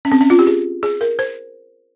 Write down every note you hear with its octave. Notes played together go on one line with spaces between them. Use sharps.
C#4
C4
C#4
F4
G4
G#4
G#4
A#4
C5